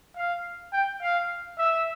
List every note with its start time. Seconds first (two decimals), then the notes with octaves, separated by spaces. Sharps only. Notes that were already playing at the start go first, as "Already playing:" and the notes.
0.16 F5
0.73 G5
1.02 F5
1.58 E5